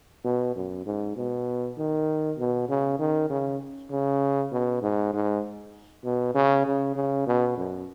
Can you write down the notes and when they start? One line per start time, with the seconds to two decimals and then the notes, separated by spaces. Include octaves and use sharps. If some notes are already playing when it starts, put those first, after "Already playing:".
0.25 B2
0.56 F#2
0.86 G#2
1.16 B2
1.77 D#3
2.38 B2
2.69 C#3
2.99 D#3
3.30 C#3
3.90 C#3
4.52 B2
4.82 G#2
5.14 G#2
6.04 B2
6.34 C#3
6.66 C#3
6.95 C#3
7.27 B2
7.58 F#2